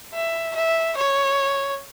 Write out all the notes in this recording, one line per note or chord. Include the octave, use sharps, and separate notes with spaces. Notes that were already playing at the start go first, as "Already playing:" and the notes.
E5
E5
C#5